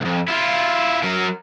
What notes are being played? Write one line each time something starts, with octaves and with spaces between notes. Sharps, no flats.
C2 F2
E4 F4
F#3 A#4